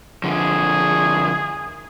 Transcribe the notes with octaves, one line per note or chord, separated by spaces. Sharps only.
D3 F3 G#4